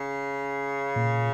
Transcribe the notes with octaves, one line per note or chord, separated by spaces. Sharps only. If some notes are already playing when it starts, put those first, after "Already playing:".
Already playing: C#3
A#2